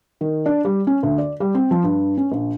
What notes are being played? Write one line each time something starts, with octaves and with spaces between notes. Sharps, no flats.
D#3
D4
G3
C#4
D2
D5
G3
C4
F3
G2
C#4
A#1